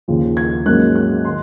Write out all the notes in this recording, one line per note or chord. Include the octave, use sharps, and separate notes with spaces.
D#2 C#3 F3
G#6
G#2 F#3 A#3 C#4 F#6
F#6
D#3 C6